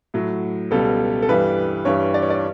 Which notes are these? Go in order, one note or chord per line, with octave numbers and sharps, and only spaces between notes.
A2 F#3
C#2 B2 G3 A4
A4
G2 E3 G3 B4
G2 E3 G3 C#5
D5
C#5
D5